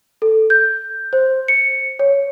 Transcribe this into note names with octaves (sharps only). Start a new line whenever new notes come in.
A4
G6
C5
C#7
C#5